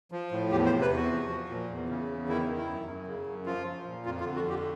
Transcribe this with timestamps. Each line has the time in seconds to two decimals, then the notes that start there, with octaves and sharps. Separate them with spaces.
0.12 F3
0.32 A2
0.51 E2 G4
0.66 C5
0.70 C3
0.81 B4
0.91 E2 F#4
1.10 F3
1.30 F3
1.49 A#2
1.69 E2
1.89 C#3
2.09 E2
2.28 D#3 E4
2.48 D#3
2.58 E4
2.67 F#2
2.87 F#2
3.07 C#3
3.26 F#2
3.46 F3 F4
3.66 F3
3.86 A#2
4.05 F2 F4
4.20 F4
4.25 D3
4.36 F#4
4.45 F2 G4